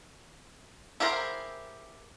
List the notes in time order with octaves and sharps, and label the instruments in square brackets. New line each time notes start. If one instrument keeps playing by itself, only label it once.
[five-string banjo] E4 G4 G#4 A#4 C5